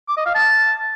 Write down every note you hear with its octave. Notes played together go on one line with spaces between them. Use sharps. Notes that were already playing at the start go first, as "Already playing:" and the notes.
D6
D#5
F5
A5